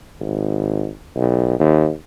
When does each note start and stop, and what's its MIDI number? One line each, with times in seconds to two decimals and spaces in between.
0.20 0.87 32
1.16 1.55 35
1.59 1.90 39